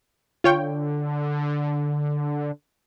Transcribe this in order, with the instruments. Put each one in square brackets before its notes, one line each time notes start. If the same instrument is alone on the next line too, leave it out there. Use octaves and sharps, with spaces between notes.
[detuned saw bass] D3 [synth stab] F4 C#5 G5